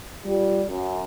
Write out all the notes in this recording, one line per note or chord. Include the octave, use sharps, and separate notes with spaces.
G3 F4
F#2